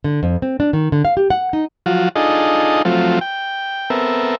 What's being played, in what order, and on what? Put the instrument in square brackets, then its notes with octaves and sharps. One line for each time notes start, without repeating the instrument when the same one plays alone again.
[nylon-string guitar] D3
F2
C4
D4
D#3
D3
F5
G4
F#5
D#4
[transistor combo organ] F3 F#3 F4 F#4
D4 D#4 F4 G#4 A4 D#5
F3 F#3 A3 C4 F4
G5
B3 C4 A4 A#4 E5